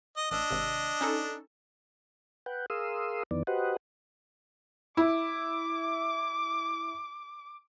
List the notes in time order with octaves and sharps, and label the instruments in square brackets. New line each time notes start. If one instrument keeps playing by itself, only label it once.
[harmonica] D#5
[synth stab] A1 E6 [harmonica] D4 D#5
[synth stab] G#1 C3 E6
C#4 D#4 A4
[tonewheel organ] B4 F#5 G5
G#4 A#4 F5 C6 D#6 E6
F2 D#3 E3 B3 D5
F#4 G4 B4 C5 D#5 F#5
[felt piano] E4 [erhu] D6